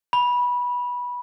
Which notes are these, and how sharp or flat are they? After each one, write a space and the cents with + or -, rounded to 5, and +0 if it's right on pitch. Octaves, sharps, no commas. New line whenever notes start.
B5 -15